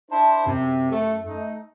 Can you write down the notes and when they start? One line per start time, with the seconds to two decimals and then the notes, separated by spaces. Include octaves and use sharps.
0.11 D4 E4 C5 A5
0.47 F#2 C3
0.91 A3
1.24 A3 D#4